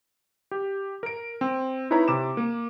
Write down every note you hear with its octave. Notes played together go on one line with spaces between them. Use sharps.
G4
A#4 D7
C4
D#4 E4 B4 C#5 A#5 B5
C3 D6 E7
A#3